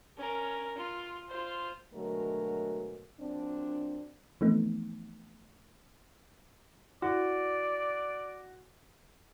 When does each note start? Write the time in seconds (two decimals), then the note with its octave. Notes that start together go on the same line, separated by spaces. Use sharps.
0.17 C#4 A#4
0.77 F4
1.28 F4 C5
1.94 B2 D3 F#3 G#3 A3 A#4
3.20 A#2 F#3 C4 D4
4.41 E3 F3 A3 B3 C4 D#4
7.02 E4 F#4 D5